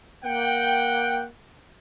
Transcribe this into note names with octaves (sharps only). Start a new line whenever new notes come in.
A#3 F#5 G5